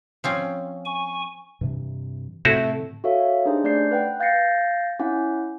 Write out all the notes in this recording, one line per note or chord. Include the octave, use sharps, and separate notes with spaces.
F3 C4 C#4
G#5 C#6
G2 C3 E3
A2 C3 A3 C4 E4 F#4
F#4 A4 C#5 E5 F5
D4 D#4 G4 G#4 C5
A3 C#4 D5 G6 C7
B4 F#5 G5
F5 G6 A6 A#6 C7 C#7
C#4 E4 F#5